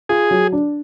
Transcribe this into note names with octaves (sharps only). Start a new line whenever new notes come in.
F4 G#4
F#3
D4